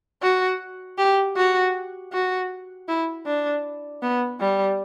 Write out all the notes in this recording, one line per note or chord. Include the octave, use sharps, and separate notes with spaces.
F#4
G4
F#4
F#4
E4
D4
B3
G3